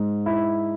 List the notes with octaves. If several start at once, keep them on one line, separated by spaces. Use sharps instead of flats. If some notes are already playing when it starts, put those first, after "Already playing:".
Already playing: G#2
E4